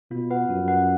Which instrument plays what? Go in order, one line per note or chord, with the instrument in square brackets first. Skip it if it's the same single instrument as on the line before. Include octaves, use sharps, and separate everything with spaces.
[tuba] B2 [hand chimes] F4
[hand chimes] B4 F#5
[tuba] F#2 [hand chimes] F4
[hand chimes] B4 F#5